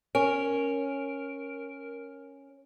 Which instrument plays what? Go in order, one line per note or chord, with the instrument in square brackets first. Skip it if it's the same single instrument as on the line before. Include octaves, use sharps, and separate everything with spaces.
[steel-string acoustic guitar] C#4 [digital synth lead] A#4